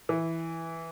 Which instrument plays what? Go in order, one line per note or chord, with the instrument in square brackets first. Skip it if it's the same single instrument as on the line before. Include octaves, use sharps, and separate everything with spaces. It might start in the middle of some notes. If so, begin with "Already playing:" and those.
[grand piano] E3